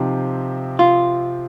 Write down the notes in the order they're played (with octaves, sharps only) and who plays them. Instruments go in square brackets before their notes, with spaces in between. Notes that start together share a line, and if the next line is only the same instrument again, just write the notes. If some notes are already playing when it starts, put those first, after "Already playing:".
Already playing: [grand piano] C3 F3 C4 G4 [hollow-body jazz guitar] D#4
[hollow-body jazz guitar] F4